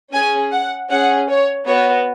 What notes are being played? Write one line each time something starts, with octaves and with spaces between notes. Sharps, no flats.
C#4 G#4 G#5
F#5
C#4 G#4 F#5
C#5
B3 F#4 C#5